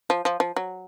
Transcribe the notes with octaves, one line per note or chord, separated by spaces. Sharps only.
F3
F3
F3
F#3